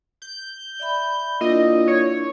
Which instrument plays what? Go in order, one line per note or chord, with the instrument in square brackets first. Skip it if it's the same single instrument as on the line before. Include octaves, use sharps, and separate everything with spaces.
[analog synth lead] G6
[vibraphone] D5 E5 B5
[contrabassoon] A#2 [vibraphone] D4 E4 A#4 [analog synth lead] D#5
[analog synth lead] C#5